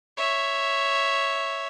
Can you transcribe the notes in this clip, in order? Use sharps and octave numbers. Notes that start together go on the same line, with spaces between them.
C#5 E5